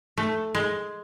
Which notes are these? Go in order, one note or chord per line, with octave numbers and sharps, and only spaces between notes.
A3
G#3